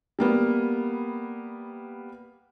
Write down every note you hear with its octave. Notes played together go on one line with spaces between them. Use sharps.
G3 A#3 B3